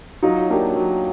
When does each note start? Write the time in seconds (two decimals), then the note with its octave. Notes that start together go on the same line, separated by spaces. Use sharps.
0.23 F#3 D#4 F4
0.50 A#3 D4 G4
0.76 F#3